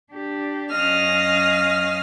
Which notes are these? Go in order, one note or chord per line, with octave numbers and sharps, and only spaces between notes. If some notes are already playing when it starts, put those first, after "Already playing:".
D4 G4
F#2 C#4 D#5 F5 D#6 F6